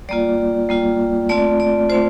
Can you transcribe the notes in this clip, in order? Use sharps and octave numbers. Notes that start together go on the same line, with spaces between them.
G3 A#3 F4 D5
G3 A#3 F4
A3 C4 F4 D5
D5
A3 C4 F4 C5